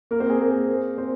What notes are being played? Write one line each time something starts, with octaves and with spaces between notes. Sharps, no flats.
A#3 A#4
C4 C5
G#4
A#3 A#4
C4 C5